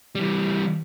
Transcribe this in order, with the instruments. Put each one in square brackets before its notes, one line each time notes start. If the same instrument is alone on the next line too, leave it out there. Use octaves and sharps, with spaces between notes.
[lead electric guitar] E3 G3